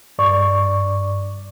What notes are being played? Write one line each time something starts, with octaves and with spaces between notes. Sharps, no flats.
G2 D5 C#6